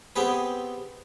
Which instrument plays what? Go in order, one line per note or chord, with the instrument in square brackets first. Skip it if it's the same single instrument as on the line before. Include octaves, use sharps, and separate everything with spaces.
[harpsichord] B3 C4 G4 G#4 B4